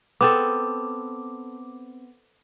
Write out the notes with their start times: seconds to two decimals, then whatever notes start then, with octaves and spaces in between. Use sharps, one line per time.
0.21 B3 C4 A4 D6